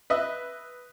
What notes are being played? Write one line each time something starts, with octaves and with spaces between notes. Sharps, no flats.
B4 D#5 E5